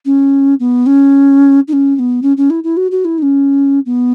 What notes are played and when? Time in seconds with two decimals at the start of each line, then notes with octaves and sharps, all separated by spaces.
0.05 C#4
0.60 B3
0.86 C#4
1.68 D#4
1.73 C#4
1.96 C#4
1.99 B3
2.22 C#4
2.37 C#4
2.50 E4
2.64 E4
2.77 F#4
2.91 F#4
3.05 E4
3.18 D#4
3.22 C#4
3.86 B3